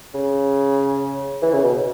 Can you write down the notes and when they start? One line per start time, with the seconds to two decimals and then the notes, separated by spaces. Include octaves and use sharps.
0.14 C#3
1.42 E3
1.53 C#3
1.63 B2